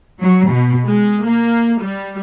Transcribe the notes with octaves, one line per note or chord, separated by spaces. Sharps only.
F#3
B2
G#3
A#3
G3